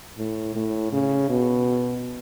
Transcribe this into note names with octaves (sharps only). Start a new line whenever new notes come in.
A2
A2
C#3
B2